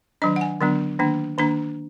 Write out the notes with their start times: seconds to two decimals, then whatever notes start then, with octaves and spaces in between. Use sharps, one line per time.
0.22 D#3 F#3 D4 D#5
0.36 F#5
0.41 G#5
0.61 D3 F#3 B3 D4
0.99 D#3 A#3 D4
1.38 D#3 A#3 D4 A#5